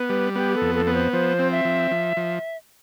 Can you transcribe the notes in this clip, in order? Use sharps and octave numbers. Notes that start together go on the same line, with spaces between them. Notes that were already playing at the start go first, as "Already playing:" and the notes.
Already playing: B3 B4
G3
B3 G4
A4
F2
A4
B3
C5
F3 C5
C4
E5
F3
F3
F3